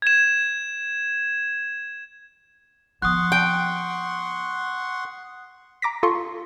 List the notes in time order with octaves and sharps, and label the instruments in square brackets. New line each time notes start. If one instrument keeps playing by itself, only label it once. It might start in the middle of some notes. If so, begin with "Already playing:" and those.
[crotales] G#6 E7
[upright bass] F3 B3 [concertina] F#5 C6 C#6 [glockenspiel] D#6 F#6
[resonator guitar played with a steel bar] G5
[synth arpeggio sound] A#5 D6 A#6 B6
F4 A4 C6 C#6